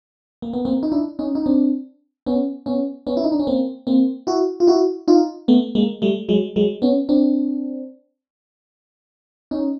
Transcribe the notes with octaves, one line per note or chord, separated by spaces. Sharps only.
A#3
B3
A#3 C4
D#4
D4 E4
C#4 D#4
D#4
C4 D4
B3 C#4
B3 C#4
B3 C#4
E4
D#4
D4
C#4
A#3 C4
A#3 C4
E4 F#4
F4
E4 F#4
D#4 F4
A3 B3
G#3 A#3
G3 A3
F#3 G#3
F#3 G#3
B3 C#4
C4 D4
C#4 D#4